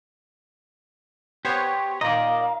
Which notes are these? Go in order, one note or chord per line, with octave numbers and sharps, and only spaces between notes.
B3 G4 C5 C#5
A#2 D#3 D5 D#5 F5 A#5